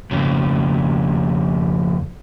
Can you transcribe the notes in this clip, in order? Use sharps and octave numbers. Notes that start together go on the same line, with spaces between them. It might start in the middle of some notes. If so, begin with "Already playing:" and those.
F2 C#3